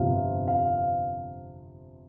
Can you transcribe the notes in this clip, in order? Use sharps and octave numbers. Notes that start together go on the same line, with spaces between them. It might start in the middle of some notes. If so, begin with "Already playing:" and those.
Already playing: G1 F2 C3 F3 F5
F5